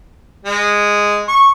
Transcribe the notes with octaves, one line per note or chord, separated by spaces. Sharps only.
G#3
C#6